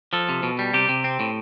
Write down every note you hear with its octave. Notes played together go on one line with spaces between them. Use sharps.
F3 A4
C3
B2
G3
C3 G4
C3
C4
A2